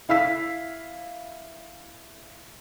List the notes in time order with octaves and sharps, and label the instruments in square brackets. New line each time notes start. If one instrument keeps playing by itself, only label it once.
[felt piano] E4 F5 E6 B6